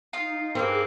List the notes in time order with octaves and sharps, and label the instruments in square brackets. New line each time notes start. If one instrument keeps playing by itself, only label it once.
[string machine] D#4 [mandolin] F4 F5
[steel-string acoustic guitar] G2 C4 [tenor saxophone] A#3 [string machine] G#4 D6 F#6